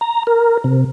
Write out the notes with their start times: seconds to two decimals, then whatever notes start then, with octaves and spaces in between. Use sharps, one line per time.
0.01 A#5
0.27 A#4
0.64 C3